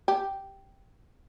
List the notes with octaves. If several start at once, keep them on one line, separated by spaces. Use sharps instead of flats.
G4